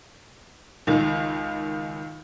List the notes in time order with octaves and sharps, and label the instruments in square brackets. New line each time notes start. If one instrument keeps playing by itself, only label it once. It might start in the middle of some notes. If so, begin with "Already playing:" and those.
[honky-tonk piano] C#2 D#3